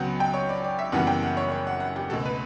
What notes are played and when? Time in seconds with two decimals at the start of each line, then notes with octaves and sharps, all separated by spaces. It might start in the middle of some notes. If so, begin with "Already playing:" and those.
Already playing: C#2 C#3 F#3 B3 F#5 G5
0.20 G5
0.34 C#5
0.49 D5
0.64 D5
0.79 E5
0.92 F#1 F#2 E3 G3 B3 F#5
1.07 G5
1.23 F#5
1.37 C#5
1.52 C#5
1.67 F#5
1.80 F#5
1.96 G4
2.10 C#2 B2 A3 A4
2.25 B4